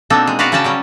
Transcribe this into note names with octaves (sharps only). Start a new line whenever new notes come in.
B2 A#3 C4 D4 D#4 A4
G#3
F#4 B4 D5 F5 F#5 A#5
C#3 C#4 F#4 D5 G5 A5
F#3 G3 C#4